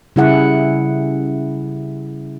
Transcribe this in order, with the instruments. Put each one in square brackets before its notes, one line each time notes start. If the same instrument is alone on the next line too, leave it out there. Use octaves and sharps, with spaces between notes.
[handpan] C#3 G3 E4 G#4 F#5